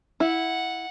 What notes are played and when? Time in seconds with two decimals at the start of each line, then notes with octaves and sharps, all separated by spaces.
0.20 E4 F#5